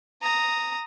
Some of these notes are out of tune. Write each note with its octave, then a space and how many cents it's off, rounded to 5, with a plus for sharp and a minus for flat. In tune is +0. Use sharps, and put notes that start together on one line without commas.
A#5 -10 D#6 +0